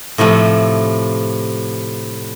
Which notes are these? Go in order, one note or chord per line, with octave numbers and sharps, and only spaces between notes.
A2 C3 F3 A3